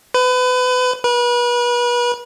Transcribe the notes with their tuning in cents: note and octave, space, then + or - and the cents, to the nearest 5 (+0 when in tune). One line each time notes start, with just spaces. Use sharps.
B4 +30
B4 -35